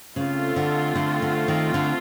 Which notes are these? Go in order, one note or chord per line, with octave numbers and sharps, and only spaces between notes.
C#3 A3 C4 F4
D3
D3
D3
D#3
D3